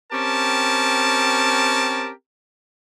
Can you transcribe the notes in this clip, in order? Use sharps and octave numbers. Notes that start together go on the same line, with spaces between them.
C4 C#4 G4 A#4 A5